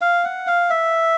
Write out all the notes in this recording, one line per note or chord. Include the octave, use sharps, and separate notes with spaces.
F5
F#5
F5
E5